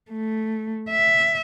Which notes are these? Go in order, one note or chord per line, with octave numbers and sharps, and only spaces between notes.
A3
E5